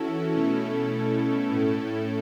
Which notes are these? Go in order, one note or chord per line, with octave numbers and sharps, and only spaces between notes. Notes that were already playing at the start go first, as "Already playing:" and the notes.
Already playing: E3 C#4 E4 F#4 A4
B2 A3 C#4
A2 A3 C#4